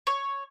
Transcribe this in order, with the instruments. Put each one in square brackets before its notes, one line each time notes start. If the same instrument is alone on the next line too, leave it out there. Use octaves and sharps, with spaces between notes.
[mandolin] C#5